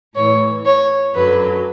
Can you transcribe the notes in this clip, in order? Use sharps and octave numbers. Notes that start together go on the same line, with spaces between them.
A2 E3 C#5
C#5
F#2 D3 F#3 B4